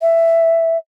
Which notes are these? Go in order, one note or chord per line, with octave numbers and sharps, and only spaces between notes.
E5